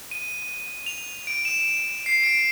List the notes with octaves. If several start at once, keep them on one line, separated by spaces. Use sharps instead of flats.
D#7
F7
D7
E7
C7
D7